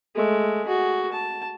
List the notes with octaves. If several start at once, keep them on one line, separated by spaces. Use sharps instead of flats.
G#3 A3
F#4 G#4
A5